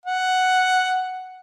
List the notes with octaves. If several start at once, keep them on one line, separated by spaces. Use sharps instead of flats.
F#5